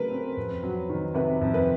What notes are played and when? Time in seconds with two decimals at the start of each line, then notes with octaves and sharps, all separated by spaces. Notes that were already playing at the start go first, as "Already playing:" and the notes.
Already playing: C#3 F#3 A3 C4 A#4 B4
0.11 C4
0.37 F2
0.63 F#3
0.89 D#3
1.14 C3 B4
1.41 F2
1.54 B4